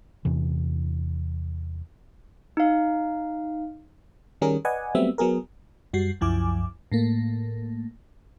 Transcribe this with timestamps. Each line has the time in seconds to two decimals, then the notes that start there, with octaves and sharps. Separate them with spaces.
0.25 E2 C3 E3
2.57 D#4 F5
4.41 D#3 G3 C#4 G#4 A#4
4.65 B4 D5 D#5 F#5 G#5
4.95 F#3 G3 A3 B3 C4 E5
5.18 F#3 B3 G#4 A#4
5.93 F#2 G3 F#4 C7
6.21 C2 F#2 F3 E4 G#5 D6
6.92 A2 A3 A#3